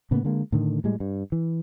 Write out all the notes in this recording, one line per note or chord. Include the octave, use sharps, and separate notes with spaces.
A2 C#3 A#3 B3
D3 G#3 A#3
A2 D3 D#3
A2 G3 G#3
G2
E3